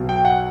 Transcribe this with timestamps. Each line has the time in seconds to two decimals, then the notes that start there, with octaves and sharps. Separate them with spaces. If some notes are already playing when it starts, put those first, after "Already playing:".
Already playing: B1 B2 F#3
0.09 G5
0.25 F#5